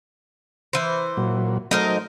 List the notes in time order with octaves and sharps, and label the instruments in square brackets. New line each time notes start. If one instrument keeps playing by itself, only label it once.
[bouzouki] E3 C5
[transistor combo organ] A#2 F#3
[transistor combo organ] F#3 A3 D#5 [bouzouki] D#4 A#4 C5